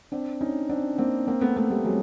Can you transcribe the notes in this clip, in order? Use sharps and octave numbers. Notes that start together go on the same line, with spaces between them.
C4 D4
C#4 D#4
C4 D4
A#3 C4
A#3 C4
A3 B3
A3 B3
G3 A3
F#3 G#3